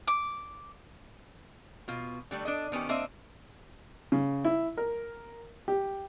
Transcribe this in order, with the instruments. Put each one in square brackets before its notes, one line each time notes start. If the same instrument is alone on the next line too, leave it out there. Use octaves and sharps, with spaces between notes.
[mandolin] D6
[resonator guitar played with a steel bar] B2 F4
D3 G3 A3
D4 A4 D#5
D#3 B3 C#4 G4
A#3 C4 D4 C5 D#5 E5
[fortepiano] C#3
E4
A#4
G4